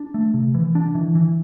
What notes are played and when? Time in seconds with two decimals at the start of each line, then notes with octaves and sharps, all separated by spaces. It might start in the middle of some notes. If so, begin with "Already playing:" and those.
Already playing: D4
0.14 A3
0.34 C3
0.55 E3
0.75 D4
0.95 E3
1.15 E3